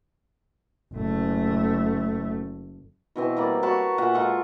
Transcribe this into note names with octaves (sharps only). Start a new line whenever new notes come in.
F#1 A3
B2 E3 C4
G3 A#3 D5
F#4 C#5 A5 B5
A#2 E5 F#5
G#3 F4 A4 C#6